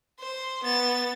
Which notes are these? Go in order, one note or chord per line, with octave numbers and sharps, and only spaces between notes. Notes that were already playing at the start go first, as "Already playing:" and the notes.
C5
B3 A6